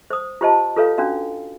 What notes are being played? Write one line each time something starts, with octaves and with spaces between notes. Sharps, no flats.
C5 D#6
F4 G4 C5 D#5 A5
F4 A4 B4 C#5 F5
C#4 D4 F#4 F5